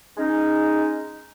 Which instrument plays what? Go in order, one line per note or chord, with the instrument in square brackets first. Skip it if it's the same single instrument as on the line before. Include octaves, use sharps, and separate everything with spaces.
[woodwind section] G#3 C#4 D#4